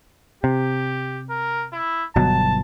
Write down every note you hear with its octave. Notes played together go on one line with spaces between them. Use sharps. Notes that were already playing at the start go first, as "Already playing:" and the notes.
C3 G4
A#4
E4
G1 B2 F#3 A5